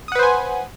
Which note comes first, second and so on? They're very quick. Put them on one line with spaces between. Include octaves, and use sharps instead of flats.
D#6 F#5 B4 C5 G#5